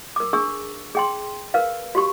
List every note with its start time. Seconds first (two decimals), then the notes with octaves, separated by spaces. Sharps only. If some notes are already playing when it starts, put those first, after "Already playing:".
0.16 A#4 D6
0.33 D4 G#4 C#6 E6
0.95 G#4 G5 C6
1.54 A#4 B4 F5
1.95 F#4 G4 C#6